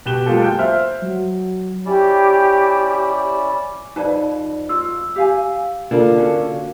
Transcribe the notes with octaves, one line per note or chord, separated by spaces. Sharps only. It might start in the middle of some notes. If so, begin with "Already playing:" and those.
B2 G4 F#6 E7 G7
F#3 G#3 A#3 F4 G4 A4
G5 G6 D7
C5 E5 F6
F#3
C#4 E4 G4 D5
F2 D#4 B4 D5 A5
F4 E6
G4 F5 G#5
D3 A#3 F4 A4
C#4 F#4 A4